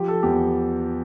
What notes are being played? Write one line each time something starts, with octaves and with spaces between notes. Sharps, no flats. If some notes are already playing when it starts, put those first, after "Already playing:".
Already playing: F3 G4
A4
E2 G4